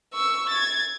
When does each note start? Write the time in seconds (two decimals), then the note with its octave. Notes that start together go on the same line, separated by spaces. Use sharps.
0.14 C#6 E6
0.49 G#6 A6